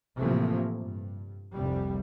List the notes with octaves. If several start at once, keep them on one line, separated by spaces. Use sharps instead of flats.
A2 C3 E3 F3 A3 A#3
G2
F1 C2 C3 G3